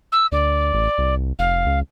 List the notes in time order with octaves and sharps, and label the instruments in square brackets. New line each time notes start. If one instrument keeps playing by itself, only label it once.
[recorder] E6
[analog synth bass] D2 [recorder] D5
[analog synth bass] A1
C2
[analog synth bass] F1 [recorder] F5
[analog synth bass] C#2